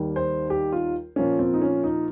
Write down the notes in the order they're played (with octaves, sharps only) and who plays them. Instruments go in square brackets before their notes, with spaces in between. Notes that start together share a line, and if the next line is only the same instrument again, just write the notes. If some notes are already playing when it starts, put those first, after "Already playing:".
Already playing: [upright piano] D#2 D#3 G3
[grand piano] C5
G4
F4
[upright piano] A#2 F3 A#3 F4 [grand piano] C#4
[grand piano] C4
D#4
C#4
D#4